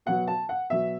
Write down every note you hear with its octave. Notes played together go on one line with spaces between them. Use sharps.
B2 F#3 B3 F#5
A5
F#5
B2 F#3 B3 E5